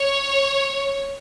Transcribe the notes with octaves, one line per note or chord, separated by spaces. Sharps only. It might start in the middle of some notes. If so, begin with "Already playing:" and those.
Already playing: C#5